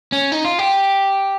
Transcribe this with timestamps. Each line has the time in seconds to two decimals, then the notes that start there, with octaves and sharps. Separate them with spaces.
0.12 C#4
0.32 D#4
0.45 F4
0.59 G4